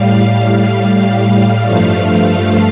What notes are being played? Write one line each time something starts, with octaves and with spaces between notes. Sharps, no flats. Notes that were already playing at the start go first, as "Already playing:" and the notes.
Already playing: A2 G3 F5
F5
G2 F3 A3